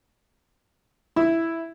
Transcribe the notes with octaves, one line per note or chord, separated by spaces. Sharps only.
E4